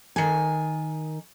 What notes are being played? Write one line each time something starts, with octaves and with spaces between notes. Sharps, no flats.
D#3 G#5